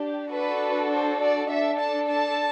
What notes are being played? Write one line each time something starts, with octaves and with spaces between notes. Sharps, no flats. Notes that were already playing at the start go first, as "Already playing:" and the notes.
Already playing: D4 G4
D4 F#4 A4 B4
C5
D5
D4 A4 E5
A5
A5